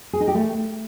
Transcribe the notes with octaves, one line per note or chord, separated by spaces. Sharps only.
G#4
D#4
G4
A3